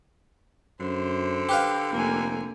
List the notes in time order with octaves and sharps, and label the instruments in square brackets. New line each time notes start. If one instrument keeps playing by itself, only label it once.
[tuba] F#2 [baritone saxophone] D3 [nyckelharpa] C5
[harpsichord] G4 B4 F5
[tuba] F1 [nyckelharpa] A#3 G#5